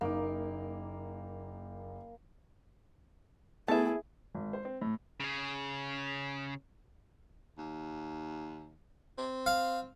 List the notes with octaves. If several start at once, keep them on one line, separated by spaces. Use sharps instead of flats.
F#1 A#3 D#4 D6
A3 B3 E4 G#4 E5 A5
G#1
C5
C4
A2
C#3 G#4
D#2
C4
F5